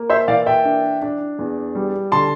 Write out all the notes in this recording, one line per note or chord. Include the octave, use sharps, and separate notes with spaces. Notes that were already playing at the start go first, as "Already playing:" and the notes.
Already playing: A#3
C5 E5
E3 D5 F5
E5 G5
D4
D4
E2
G3
D3 A5 C6